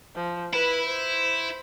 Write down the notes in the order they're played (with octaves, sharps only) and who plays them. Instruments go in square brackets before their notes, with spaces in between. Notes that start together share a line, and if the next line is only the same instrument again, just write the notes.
[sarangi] F3
[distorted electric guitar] E4 [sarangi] B4
[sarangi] C5